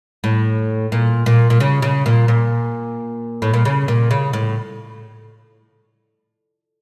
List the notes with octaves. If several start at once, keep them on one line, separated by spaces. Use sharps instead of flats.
A2
A#2
A#2
A#2
C#3
C#3
A#2
A#2
A2
A#2
C#3
A#2
C#3
A2